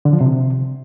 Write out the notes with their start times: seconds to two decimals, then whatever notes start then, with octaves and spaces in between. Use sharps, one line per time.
0.05 D3
0.13 F3
0.21 C3